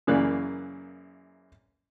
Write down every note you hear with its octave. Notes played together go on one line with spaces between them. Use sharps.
F#2 C#3 E3 A#3 D5 F#6